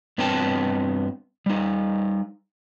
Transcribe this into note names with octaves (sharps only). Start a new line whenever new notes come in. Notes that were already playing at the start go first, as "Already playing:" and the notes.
G2 B3 C4 C#5 G5 A5
G3 D#4